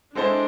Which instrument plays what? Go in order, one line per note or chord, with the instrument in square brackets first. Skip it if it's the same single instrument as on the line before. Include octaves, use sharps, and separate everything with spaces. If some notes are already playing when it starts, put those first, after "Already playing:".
[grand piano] G#3 C4 E4 A4 C5 [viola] D4